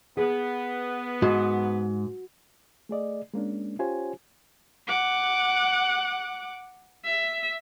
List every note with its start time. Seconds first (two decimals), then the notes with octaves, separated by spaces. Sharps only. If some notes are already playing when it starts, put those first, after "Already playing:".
0.17 B3 G#4
1.22 G#2 F#4
2.89 A3 G#4 D5 D#5
3.34 G#3 A#3 C#4 D4
3.79 C#4 F4 G4 C5 C#5 G#5
4.87 F#5 D6
7.04 E5